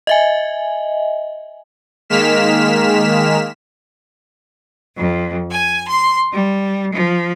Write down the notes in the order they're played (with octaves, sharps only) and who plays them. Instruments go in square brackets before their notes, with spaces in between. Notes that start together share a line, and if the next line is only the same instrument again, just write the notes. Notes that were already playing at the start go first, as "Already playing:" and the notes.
[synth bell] D#5 E5 G#5
[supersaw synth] D#3 G#3 A#3 F6 B6 E7
[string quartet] F2
G#5
C6
G3
F3